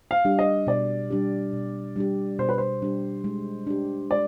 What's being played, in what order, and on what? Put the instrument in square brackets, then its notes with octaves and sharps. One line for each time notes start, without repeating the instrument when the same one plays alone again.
[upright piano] F5
[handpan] G3 D4 G4
[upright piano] D#5
[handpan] B2 [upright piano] D5
[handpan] G3 D4 G4
B2
G3 D4 G4
[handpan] B2 [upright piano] C5
[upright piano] B4
C5
[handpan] G3 D4 G4
G#3
D4 G4
[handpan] G#3 [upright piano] D5